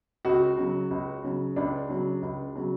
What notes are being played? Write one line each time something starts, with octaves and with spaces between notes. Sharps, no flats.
C#2 F#4
C#3 F#3
C#2
C#3 F#3
C#2 D4
C#3 F#3
C#2
C#3 F#3